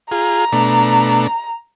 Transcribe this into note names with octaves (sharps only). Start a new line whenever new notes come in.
F4 G#4 A#5
B2 A3 D4